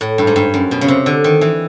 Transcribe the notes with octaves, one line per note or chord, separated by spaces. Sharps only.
A2
G2
G#2
G2
F#2
B2
C#3
C3
D3
D#3
E3